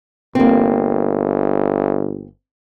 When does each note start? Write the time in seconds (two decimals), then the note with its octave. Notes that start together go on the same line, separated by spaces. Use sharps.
0.35 G1 A#3 C4